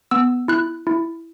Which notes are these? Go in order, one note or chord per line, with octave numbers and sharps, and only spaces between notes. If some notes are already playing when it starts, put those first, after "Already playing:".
B3 E6
E4 F#6
E4